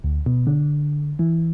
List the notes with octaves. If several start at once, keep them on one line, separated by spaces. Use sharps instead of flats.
D2
B2
D3
E3